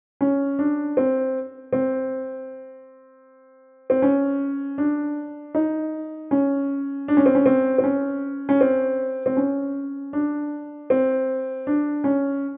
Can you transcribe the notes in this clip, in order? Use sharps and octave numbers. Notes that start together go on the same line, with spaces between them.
C#4
D4
C4
C4
C4
C#4
D4
D#4
C#4
D4
C#4
C4
C#4
C4
C4
C#4
C#4
C4
C4
C#4
D4
C4
D4
C#4